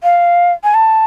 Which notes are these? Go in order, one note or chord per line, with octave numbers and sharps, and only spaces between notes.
F5
G#5
A5